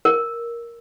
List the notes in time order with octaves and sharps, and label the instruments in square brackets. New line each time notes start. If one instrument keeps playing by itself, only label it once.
[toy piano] A#4